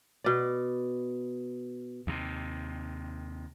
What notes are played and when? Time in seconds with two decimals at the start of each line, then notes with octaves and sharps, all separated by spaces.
0.24 B2 D5
2.07 D#2 C3